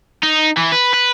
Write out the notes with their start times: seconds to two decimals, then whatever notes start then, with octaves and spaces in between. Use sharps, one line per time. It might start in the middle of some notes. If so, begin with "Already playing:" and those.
0.23 D#4
0.57 E3
0.72 B4
0.94 B4